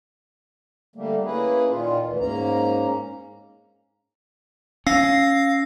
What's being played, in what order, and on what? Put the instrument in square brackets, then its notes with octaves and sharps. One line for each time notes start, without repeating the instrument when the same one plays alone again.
[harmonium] D3 G3 A3 A#3
A#3 C#4 E4 G#4 B4
A#2 D#3 F4
D2 E3
G#2 A#3 C#4 A#5
[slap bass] C#4 [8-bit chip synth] F5 [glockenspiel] E6 A#6 C7